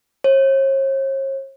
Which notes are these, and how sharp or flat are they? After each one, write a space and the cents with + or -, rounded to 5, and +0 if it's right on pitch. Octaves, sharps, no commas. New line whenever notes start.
C#5 -45